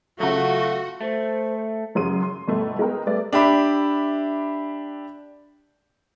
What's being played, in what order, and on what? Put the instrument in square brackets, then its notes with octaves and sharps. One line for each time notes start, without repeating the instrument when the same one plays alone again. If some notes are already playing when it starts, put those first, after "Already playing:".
[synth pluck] C#3 F#3 [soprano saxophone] A3 [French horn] F4 [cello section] F#4
[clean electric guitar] A3 [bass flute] C5
[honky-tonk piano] F#2 C#3 F#3 G#4 C6 D#7
C6
G1 B2 A3
G#3 B3 A#4 G5
G3 A3 G4 B4 D5 E5
[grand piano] D4 G4 E5 B5 D6